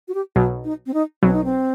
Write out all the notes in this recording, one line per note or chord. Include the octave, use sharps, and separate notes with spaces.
F#4
G4
B1 B2 F#3 F#4
D#4
C4
D#4
B1 B2 F#3 C4
D#4
C4